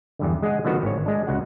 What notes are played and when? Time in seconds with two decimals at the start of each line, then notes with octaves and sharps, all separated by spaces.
0.19 E2 G2 D3
0.42 G#3 G#4 D#5 F#5
0.65 D3 D#3 F3 B3 F#4
0.83 G#1 C#5
1.06 G#3 D4
1.27 C#2 F#4 F#5